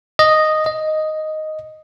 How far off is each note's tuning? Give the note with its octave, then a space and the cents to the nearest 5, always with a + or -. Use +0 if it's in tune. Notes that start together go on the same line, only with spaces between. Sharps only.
D#5 -5
D#5 +0